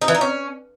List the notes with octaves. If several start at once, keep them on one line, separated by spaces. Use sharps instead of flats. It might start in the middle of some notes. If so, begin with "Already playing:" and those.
D#4
E3
D#4
C#4